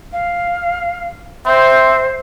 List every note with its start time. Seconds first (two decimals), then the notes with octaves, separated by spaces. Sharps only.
0.12 F5
1.46 C4 C5 E5